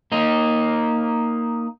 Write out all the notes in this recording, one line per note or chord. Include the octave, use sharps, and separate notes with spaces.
A#3 D#4